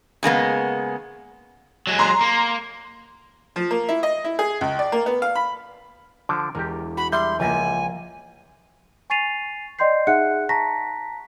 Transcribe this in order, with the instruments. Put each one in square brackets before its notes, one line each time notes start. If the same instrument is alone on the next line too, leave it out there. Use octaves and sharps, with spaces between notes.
[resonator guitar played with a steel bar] C#3 G#3 A#3 B3
[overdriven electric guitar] F#3 G#3
[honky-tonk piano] A#5 C6
[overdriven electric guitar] A#3
[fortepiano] F3
A#3
E4
D#5
E4
G#4
C#2
D5
A#3
B3
F5
B5
[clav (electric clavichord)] D3 F3 [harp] D6
[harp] E1 [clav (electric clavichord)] G4 A#4
[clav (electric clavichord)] F#4 [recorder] B5
[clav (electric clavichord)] G3 [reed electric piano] E5 G6 [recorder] C6
[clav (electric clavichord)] C#2 [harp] F3 A#3 [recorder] G#5
[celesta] G#5 C#6 A6 C7 D#7 F7
D5 D#5 G5 C6 G6 C7
D#4 G#4 E5 F#5 F#6 C#7
A5 A#5 C#6 A#6 B6